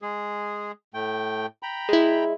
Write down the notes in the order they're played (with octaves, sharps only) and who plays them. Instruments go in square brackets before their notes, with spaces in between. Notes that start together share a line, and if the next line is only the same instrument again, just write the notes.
[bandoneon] G#3 G#4
A2 A3 G5
G5 A#5 B5
[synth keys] G#3 E4